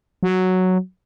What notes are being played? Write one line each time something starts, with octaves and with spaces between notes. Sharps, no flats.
F#3